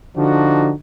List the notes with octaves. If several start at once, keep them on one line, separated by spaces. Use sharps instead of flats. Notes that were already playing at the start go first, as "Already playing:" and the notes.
D3 F3 D4 D#4 F#4